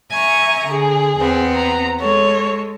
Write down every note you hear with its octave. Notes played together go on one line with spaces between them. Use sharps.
E5 G#5 A#5 C#6
D3 G#4
E2 B3 C4
A#5
G#3 A4 C#5